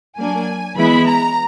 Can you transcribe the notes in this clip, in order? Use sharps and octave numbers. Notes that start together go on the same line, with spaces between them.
F#3 A#3 D4 G#5
E3 G#3 B3 E4 B5
A#5